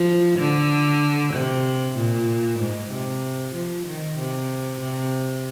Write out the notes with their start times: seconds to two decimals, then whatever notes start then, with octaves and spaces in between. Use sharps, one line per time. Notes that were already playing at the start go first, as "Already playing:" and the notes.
Already playing: F3
0.39 D3
1.33 C3
1.96 A#2
2.59 G#2
2.91 C3
3.55 F3
3.86 D#3
4.18 C3
4.80 C3